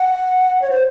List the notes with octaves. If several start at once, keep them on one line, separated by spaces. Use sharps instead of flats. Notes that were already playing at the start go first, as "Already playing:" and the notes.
Already playing: F#5
C#5
C5